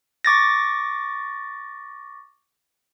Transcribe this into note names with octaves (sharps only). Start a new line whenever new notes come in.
C#6 D6 A6 A#6